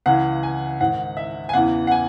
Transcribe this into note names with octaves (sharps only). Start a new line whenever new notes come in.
C#2 C#3 E3 F#5
G#5
G#2 D#3 F#5
E5
G#5
E2 C#3 E3 F#5
F#5
G#5